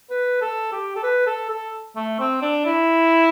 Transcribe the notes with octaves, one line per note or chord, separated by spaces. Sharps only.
B4
A4
G4
A4
B4
A4
A4
A3
C4
D4
E4